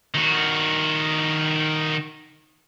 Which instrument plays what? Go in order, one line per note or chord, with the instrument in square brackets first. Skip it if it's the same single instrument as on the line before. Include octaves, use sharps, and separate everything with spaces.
[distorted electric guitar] D#3 F#4